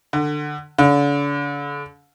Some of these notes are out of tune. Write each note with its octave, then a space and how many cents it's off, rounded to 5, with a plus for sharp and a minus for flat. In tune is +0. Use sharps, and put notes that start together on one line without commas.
D3 +20
D3 -40